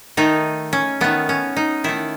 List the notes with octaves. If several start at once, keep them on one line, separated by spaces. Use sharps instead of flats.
D#3 A3 D#4
C#4
D#3 A3 B3
C#4
D#4
D#3 A3 E4